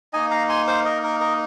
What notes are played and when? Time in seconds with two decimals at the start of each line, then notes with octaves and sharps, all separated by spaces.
0.13 A#3 D#4 D#5 G#5
0.31 F5 A#5
0.49 G#5 C6
0.67 C5 F5
0.85 A#4 D#5
1.03 A#4
1.20 A#4 D#5